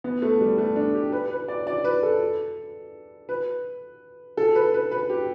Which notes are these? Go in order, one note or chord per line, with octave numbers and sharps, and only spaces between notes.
B3
A3
G3
A3
D4
G4
B4
B4
D5
D5
B4
A4
B4
A4
B4
B4
B4
G4